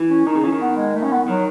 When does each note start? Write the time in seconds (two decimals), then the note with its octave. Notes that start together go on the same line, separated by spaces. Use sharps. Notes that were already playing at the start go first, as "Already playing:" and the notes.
Already playing: E3
0.10 C#4
0.27 D#3 D#4
0.35 C#3
0.43 E3 C#4
0.53 D#3
0.61 B3
0.77 G#3
0.95 A3
1.03 C#4
1.12 B3
1.28 D#3 F#3